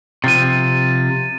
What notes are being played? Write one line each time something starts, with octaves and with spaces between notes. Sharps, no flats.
C3 F3 A6 D#7